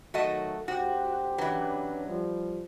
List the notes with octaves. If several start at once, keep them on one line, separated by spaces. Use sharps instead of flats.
D#3 F#3 A3 F#4 D#5
D2 F#4 G4 C5
E3 F#3 C#4 D4 B4
F3 G3